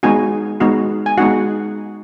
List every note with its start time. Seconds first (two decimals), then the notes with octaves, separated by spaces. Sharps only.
0.03 G#3 B3 D#4 F#4 G#5
0.60 G#3 B3 D#4 F#4
1.06 G#5
1.18 G#3 B3 D#4 F#4 F#5